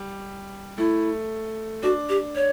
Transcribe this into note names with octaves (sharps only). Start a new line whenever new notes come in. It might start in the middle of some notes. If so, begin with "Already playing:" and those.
Already playing: G3
A3 E4
D4 F#4
G4
C#5